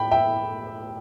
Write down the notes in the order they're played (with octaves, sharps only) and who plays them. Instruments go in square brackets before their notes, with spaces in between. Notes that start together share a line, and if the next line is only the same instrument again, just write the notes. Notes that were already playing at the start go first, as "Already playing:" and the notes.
Already playing: [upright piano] A2 G5 B5
E5 G5